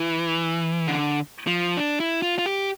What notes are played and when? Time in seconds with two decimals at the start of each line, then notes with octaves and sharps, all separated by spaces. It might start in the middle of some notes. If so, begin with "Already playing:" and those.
Already playing: E3
0.87 D3
1.47 F3
1.77 D4
2.00 E4
2.22 F4
2.38 F4
2.46 G4